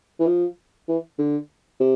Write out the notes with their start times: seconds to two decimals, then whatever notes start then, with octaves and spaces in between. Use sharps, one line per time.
0.19 E3
0.27 F3
0.88 E3
1.18 D3
1.80 C3